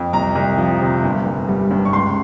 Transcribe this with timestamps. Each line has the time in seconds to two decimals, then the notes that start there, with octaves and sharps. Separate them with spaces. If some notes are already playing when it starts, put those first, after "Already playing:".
Already playing: F2
0.13 C2 A#5
0.35 C2
0.58 F3
0.81 C3
1.03 G1
1.26 G1
1.48 G3
1.71 G2
1.85 C#6
1.93 C#2 C6